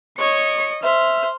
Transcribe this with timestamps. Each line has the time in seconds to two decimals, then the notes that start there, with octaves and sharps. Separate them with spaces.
0.18 C#5 D#5 C#6 C#7
0.83 C5 E5 F6